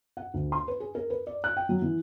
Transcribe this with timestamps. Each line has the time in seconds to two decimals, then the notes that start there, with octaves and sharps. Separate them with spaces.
0.17 F#5
0.34 D2
0.52 C6
0.68 B4
0.80 G#4
0.95 A#4
1.10 B4
1.27 D5
1.44 F#6
1.57 G5
1.69 F#3
1.82 E3